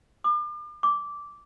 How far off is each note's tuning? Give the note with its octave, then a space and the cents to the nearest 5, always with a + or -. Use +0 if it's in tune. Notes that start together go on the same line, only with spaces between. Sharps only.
D6 +40
D6 -10